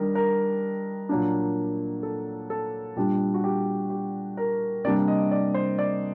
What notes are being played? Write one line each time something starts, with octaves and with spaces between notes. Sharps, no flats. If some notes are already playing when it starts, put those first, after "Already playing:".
Already playing: D#3 G3 D4 A#4
A#4
A#2 F#3 A#3 D4
A4
A4
A#2 G3 D4 G4
F#4
G4
G4
A#4
C3 G3 A#3 D4 D5
D#5
D5
C5
D5